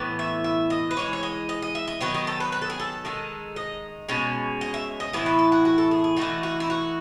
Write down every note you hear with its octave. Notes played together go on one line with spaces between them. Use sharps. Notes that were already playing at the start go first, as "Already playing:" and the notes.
Already playing: A2 E3 B3
E5
E5
D#5
B4
E3 G#3 D#4 C#5
C#5
D#5
D#5
D#5
E5
D#5
D#3 F#3 B3 D#4 C#5
D#5
A4
B4
B4
A4
G#4
A4
D#3 G#3 D#4
D#5
B2 G#3 C#4
D#5
E5
D#5
A2 E3 B3 E4 D#5
B4
A4
F#4
F#4
A4
G#4
G#4
E3 A3 D#4 F#4
F#4
E4
F#4